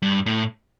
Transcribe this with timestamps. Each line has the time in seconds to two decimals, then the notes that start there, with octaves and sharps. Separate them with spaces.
0.02 G2
0.26 A2